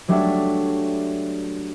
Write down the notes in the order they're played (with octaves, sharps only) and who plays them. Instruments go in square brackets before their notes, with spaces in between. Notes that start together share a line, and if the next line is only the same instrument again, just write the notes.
[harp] F#3 G3 A3 D4